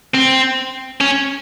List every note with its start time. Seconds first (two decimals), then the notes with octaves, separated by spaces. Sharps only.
0.15 C4
1.01 C#4